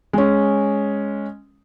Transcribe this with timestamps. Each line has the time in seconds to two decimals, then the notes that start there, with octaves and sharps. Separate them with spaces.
0.13 G#3 C#4